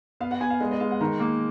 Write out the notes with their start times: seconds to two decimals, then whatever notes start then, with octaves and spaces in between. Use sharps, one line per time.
0.20 B3 F5
0.31 F#5
0.40 B3 G#5
0.50 F5
0.61 G#3 D#5
0.71 D#5
0.80 G#3 F5
0.91 F#5
1.01 D#3 A#5
1.20 A#3